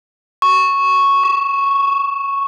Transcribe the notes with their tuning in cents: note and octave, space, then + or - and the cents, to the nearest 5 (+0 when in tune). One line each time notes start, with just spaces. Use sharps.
C#6 -5
C#6 +35